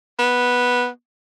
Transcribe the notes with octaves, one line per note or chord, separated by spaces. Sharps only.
B3